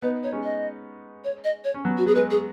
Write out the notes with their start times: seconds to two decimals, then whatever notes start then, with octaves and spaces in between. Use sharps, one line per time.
0.02 B3 D#4 B4
0.23 D#4 C#5
0.33 G#3 C#4
0.43 D#5
1.24 C#5
1.44 D#5
1.64 C#5
1.74 C#4
1.85 F#3 B3
1.98 F#4
2.06 B3 G#4
2.15 G#3 B4
2.31 G#4